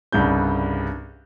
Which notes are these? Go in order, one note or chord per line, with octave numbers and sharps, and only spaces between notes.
C2 G2 C#3 G6